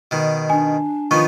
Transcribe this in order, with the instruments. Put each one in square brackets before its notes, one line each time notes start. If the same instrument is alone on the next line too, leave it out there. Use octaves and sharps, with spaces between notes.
[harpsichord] B2 D#3
[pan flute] D4 [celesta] G#5
[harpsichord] D#3 F3 B3 [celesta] C#6